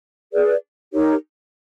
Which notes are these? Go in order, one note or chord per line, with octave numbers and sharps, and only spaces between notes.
G#4 B4 D5
D#4 G4 A#4 C#5